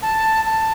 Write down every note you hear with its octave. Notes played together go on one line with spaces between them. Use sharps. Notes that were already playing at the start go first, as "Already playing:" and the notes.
A5
A5